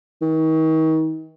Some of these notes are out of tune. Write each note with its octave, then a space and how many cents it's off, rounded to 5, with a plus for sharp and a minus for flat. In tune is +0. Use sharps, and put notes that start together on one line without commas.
D#3 +40